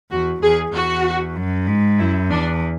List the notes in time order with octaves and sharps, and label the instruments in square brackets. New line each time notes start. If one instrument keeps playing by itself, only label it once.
[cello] E2 [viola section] F#4
[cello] E2 [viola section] G#4
[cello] E2 [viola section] F#4
[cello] F#2
G#2
[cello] F#2 [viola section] E4
[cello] E2 [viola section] D4